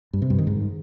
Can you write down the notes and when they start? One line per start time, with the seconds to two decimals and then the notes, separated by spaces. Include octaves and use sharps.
0.13 G2
0.22 C3
0.30 G2
0.39 D#3
0.47 G#2